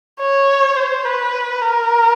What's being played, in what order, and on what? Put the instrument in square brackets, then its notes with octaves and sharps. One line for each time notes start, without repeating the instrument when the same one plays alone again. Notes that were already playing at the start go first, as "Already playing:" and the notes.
[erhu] C#5
C5
B4
A#4